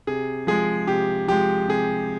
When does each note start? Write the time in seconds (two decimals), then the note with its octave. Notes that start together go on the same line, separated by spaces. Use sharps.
0.07 C3 G#4
0.47 F3 G#3 G#4
0.87 C3 G4
1.28 F3 G#3 G4
1.68 C3 G#4